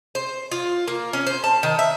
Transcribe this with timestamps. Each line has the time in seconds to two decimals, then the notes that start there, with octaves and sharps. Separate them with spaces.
0.15 C5
0.52 F4
0.88 A#3
1.13 C#4
1.27 C5
1.44 A5
1.63 D#3
1.79 E5